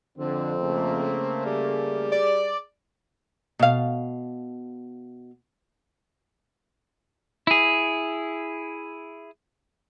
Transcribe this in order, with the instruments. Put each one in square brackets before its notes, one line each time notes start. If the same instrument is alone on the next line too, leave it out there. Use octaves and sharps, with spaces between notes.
[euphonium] F2 [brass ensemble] D3 [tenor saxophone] C4
[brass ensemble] C#3 A3 A#3
[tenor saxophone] G3 [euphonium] G#4
[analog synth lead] D5
[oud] B2 F5
[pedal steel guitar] E4 G#4